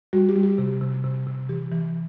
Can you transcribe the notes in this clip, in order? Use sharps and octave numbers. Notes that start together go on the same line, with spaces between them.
G3 F#4
G4
G3
G4
C3
C3
C3
C3
E3 G4
E3